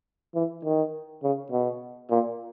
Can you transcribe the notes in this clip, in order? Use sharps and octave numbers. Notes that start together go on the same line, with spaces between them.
E3
D#3
C#3
B2
A#2